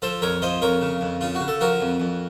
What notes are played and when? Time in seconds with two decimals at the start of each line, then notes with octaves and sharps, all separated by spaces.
0.02 F3 A4 C5
0.22 F2 A#4 C#5
0.42 F3 C5 D#5
0.62 F2 A#4 C#5
0.81 C#3
1.01 F2
1.21 C#3 F4
1.35 F#4
1.40 C#3
1.48 A4
1.61 F3 F#4 A#4
1.81 F2
2.00 F2